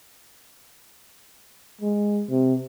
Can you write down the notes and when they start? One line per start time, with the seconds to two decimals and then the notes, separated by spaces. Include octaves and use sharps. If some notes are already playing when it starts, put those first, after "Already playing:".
1.81 G#3
2.30 C3